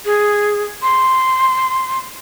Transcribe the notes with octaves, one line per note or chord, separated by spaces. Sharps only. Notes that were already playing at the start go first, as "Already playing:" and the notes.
G#4
C6